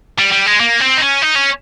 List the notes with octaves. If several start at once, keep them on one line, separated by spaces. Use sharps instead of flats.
G3
G3
G#3
A#3
C4
D#4
C#4
D#4
C#4